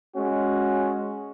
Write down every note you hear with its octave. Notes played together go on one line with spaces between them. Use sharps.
G#3 C#4 F#4